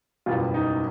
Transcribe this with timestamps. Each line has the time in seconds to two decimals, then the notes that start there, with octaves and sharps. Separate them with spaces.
0.26 F#1 E2 B2 G3 F4
0.54 D#4